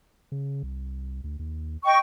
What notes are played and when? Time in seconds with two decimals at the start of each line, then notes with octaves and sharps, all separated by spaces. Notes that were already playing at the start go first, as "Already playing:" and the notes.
0.32 C#3
0.63 C2
1.24 D2
1.39 D#2
1.85 D#5 G5 C#6